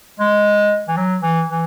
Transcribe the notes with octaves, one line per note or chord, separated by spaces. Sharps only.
G#3
E3
F#3
E3
E3